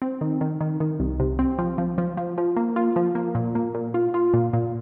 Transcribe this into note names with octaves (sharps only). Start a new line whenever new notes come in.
C4
D#3
D#3
D#3
D#3
C2
C3
C4
F3
F3
F3
F3
F3
A#3
F4
F3
A#3
A#2
A#3
A#2
F4
F4
A#2
A#2